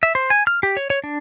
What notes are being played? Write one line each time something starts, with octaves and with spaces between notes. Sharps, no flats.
E5
C5
G#5
F6
G4
C#5
C#5
D4